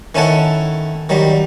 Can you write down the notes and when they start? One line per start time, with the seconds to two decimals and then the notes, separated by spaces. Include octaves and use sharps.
0.15 D#3 C#4 E4 A4 F#5
1.09 D#3 F#3 G3